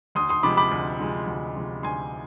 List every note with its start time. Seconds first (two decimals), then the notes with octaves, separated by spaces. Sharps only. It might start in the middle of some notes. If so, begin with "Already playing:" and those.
0.15 D2 C6 D#6
0.29 C6 D#6
0.43 C3 F3 G#3 B5 D6
0.57 B5 D6
0.71 D2
1.00 C3 F3 G#3
1.27 D2
1.56 C3 F3 G#3
1.83 D2 G#5 C6